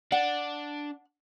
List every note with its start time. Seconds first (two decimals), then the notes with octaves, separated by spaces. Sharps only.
0.12 D4 F#5